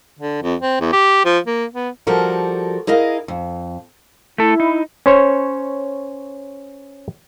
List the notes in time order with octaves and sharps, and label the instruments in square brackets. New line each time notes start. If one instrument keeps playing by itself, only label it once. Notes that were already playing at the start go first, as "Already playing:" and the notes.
[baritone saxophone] D3
F2
C4
E2
G4
F3
A#3
B3
[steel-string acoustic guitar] F3 G3 F#4 A4 A#4
E4 G#4 A#4 D#5 F5
F2
[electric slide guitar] A3 A4 [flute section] E4
[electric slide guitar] D#4
[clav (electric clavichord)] C#4 C5 C#5